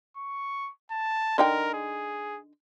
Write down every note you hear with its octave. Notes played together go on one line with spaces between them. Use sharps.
C#6
A5
D3 D#4 A#4 G5
G#4